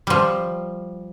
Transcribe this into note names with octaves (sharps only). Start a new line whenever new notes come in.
F3 G3